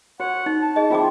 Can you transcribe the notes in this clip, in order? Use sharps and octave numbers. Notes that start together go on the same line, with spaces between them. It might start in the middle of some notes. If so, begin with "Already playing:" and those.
F#4 C#5 F#5
D#4
A5
G#4 D#5
F3 C4 E4 F4 G#4 D6